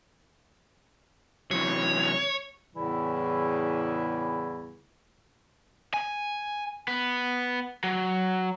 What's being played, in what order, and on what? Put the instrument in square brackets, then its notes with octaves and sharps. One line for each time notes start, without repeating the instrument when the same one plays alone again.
[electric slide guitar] C3 E3 F#3 [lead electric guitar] C#5
[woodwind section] E2 A2 C#3 E3 G3 E4
[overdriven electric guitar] G#5
B3
F#3